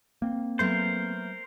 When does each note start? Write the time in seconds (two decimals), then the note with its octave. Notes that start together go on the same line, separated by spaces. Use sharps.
0.22 A#3 C4
0.59 F#3 A3 B3 A#4 C5